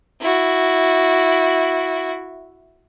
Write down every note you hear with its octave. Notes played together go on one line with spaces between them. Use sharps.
E4 F#4